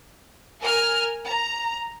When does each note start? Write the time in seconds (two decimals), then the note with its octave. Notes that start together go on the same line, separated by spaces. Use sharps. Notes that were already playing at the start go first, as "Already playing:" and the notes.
0.61 A#4 G#5 F6
1.25 A#5